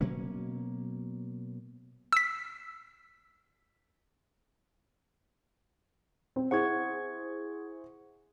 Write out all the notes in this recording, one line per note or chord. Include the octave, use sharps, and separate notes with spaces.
B2 F#3 A#3 C#4
E6 B6
C4
E4 G#4 C5 F#5 C#6 G#6